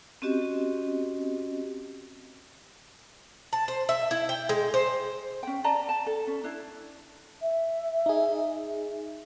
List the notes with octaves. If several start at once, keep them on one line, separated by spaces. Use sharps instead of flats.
C4 C#4 F#4 G4 D#5
A5
C5
E5
E4
G5
G#3
C5
C#4 G5
D5 A5 A#5
A5
A4
C#4
D4 E4
E5
D#4 G#4